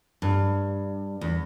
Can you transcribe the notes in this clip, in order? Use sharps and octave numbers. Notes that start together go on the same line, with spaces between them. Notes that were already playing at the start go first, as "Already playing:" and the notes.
G2
E2